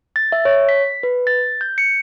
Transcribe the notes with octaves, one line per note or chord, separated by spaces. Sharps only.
A6
E5
C#5
B6
B4
A6
G6
C#7